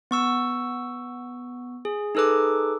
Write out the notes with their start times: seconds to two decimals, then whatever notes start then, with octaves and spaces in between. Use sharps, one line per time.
0.11 B3 C#6 E6
1.85 G#4
2.15 D#4 G#4 A4 B4 D6